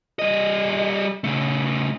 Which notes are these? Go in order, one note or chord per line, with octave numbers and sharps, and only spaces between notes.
G3 D#5
C#3 A3